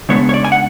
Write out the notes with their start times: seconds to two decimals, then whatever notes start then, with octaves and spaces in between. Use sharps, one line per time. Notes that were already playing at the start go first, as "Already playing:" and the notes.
0.09 C#3 G#3 B3 D4 C#5
0.29 C#5
0.34 D5
0.45 G#5
0.52 F#5